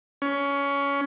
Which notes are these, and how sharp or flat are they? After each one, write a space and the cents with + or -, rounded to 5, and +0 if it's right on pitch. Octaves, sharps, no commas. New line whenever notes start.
C#4 +20